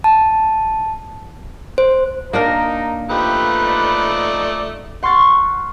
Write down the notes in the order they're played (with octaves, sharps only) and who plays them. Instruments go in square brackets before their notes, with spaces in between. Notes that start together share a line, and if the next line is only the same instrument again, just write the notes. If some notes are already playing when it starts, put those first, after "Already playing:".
[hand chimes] A5
C5
[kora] A#3 D4 A#4 [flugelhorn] D#4
[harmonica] F3 A3 D#4 [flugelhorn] G4 [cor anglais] B4
[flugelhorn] D5
[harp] F#5 C6 C#6 F6 A6